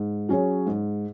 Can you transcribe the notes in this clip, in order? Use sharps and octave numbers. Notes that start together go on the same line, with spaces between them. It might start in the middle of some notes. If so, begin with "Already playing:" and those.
Already playing: G#2
F#3 C#4 G#4 C#5
G#2